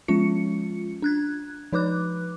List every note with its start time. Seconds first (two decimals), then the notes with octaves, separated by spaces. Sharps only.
0.08 F3 G#3 C#4 F4 C#7
1.02 D4 F#6 G#6
1.73 F3 D#4 B4 D6 F#6